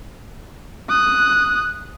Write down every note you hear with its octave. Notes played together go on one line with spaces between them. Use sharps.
D#6 F#6